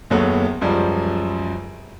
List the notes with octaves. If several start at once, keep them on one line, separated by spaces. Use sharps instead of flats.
F#1 D#2 F#3 A3 B3
C#2 F#2 F3 G3